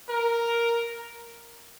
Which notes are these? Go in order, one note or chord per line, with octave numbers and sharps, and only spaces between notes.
A#4